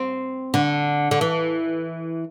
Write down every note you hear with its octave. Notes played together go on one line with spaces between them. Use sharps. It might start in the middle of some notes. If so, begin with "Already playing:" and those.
Already playing: C4
D3
D3
E3